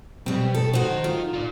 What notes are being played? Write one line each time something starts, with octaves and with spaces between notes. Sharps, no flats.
B2 G3 C4
A4
D#4 F#4 A#4 C5
F4
F4 D5